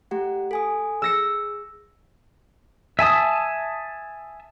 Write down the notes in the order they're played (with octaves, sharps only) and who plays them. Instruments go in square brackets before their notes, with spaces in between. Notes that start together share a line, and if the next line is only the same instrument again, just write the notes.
[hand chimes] A3 G4 F#5
A4 G#5 D#6
[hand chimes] G#4 [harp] E6 A#6 C#7
[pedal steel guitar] E5 G#5 A5 D#6